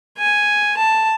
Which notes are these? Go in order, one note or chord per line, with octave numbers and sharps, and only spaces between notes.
G#5
A5